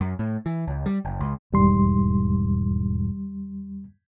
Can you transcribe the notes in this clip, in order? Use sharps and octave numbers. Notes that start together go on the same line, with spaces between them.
F#2
A2
E3
C#2
G3
F#1
C#2
E1 D#2 G#2 G3 C6